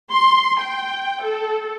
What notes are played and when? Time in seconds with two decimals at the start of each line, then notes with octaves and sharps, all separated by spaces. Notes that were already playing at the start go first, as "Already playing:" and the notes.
0.11 C6
0.60 G5
1.23 A4